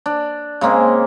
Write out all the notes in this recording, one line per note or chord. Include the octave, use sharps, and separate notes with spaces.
D4
C#3 G#3 A#3 C4